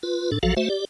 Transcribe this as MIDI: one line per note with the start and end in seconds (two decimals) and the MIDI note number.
0.03 0.31 65
0.03 0.31 71
0.32 0.39 45
0.32 0.39 62
0.32 0.39 69
0.43 0.54 34
0.43 0.54 53
0.43 0.54 54
0.43 0.54 66
0.43 0.54 69
0.43 0.54 77
0.57 0.69 57
0.57 0.69 66
0.57 0.69 72
0.57 0.69 76
0.70 0.85 67
0.70 0.85 74